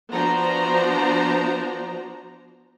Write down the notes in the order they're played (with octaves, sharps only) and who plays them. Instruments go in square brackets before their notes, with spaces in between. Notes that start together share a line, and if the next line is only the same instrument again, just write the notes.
[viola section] F3 B3 D4 F#4 C5 A#5